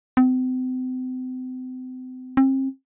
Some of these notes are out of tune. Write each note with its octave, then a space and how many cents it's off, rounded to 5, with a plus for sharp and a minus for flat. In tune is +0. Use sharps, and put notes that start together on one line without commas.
C4 -40
C4 +35